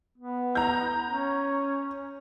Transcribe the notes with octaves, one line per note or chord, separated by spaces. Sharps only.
B3
A#5 G6
C#4